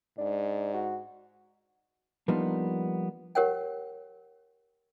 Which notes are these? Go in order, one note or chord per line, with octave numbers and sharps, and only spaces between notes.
G#2 D4
F#4
F3 G3 A#3 B3 D4 D#4
G4 A#4 C#5 F#5 G5